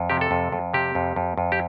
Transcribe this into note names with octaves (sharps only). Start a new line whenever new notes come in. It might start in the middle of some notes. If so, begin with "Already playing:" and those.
Already playing: F2
C3 G4
A4
F2
F2
C3 G4
F2
F2
F2
G4